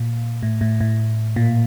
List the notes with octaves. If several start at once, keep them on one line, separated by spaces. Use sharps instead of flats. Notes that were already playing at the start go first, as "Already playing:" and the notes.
Already playing: A#2
A2
A2
A2
A#2